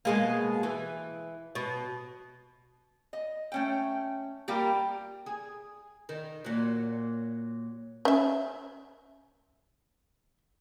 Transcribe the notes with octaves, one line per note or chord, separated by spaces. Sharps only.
B2 G#3 A#3
E3
B2
D#5
A3 C#4 G5
G3 A#3 F4 G4 A#4
G#4
D#3
A#2 F#3
C#4 E5